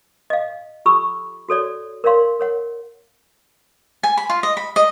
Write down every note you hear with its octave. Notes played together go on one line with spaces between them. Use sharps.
D#5 F5
F4 G4 A4 B5 C#6 E6
F#4 A4 C#5 D5
A#4 C#5 D5 F5 C6
A#4 C#5 F#5
G#5
B5
F4
D#5
B5
D#5